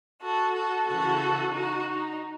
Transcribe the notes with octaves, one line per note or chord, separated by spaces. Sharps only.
F#4 A4
F#4 A4
C#3 E3 F#4 A4
D#4 F#4
D#4